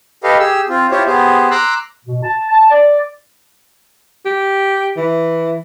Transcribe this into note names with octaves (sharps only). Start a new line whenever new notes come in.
G4 A4 B4 D#5 F5
G4 G#4 E6
C4 F4
E4 F4 G4 C5 C#5
B3 G4 G#4 C5
A#5 C6 D6 E6 F#6
B2
A5
A5
D5
G4
E3